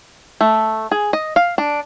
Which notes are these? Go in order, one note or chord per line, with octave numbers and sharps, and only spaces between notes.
A3
G#4
D#5
F5
D4